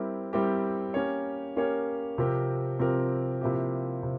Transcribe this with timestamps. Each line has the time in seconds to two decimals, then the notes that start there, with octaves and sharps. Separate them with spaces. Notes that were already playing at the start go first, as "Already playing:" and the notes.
Already playing: G3 C4 E4 G4 A#4
0.33 G3 C4 E4 G4 A#4
0.94 A#3 C#4 G4 A#4 C#5
1.56 A#3 C#4 G4 A#4 C#5
2.18 C3 F3 C4 G4 A#4
2.79 C3 F3 C4 G4 A#4
3.41 C3 F3 A#3 E4 G4
4.03 C3